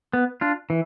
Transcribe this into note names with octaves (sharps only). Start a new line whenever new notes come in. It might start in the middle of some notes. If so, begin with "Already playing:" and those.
B3
D4 F4
E3